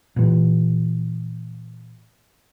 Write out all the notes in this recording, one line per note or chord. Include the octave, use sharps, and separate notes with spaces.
A#2 E3